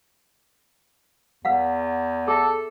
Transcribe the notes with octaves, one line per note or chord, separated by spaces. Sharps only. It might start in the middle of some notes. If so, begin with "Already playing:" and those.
E2 B4 F5 F#5
G#4 A4 E5